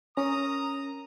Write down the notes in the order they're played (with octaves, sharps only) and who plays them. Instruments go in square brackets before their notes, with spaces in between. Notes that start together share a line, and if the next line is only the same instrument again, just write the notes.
[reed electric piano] C#4 [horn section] A#4 A#5 [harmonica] D#6